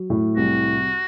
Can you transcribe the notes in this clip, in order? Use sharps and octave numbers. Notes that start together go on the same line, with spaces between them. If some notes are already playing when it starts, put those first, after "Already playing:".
Already playing: F#3
A2
C2 F#4